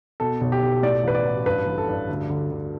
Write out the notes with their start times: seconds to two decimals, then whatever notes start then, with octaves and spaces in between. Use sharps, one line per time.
0.20 B2 A4
0.41 B1
0.52 G4
0.62 B1
0.83 A2 D5
1.04 A1 B4
1.15 D5
1.25 A1
1.46 G2 B4
1.67 A1
1.78 A4
1.88 G2
2.09 D2
2.30 D3
2.51 D3